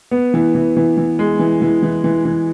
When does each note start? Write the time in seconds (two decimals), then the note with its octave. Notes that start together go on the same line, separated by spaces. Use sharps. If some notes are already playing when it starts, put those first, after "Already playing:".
0.11 B3
0.34 E3
0.55 E3
0.77 E3
0.97 E3
1.19 G#3
1.40 E3
1.62 E3
1.83 E3
2.04 E3
2.25 E3